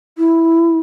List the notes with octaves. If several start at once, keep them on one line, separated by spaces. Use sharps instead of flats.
E4